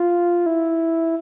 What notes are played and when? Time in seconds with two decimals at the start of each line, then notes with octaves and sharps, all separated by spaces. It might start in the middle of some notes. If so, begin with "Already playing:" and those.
Already playing: F4
0.46 E4